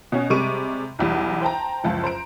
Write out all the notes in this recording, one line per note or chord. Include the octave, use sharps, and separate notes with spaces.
B2 C#4
C3 G3 G#3 C#6 D7 D#7
B1 E2 G3
C5 G5 A5 A#5
F#1 C#2 F3 A5
C5 A#5 D7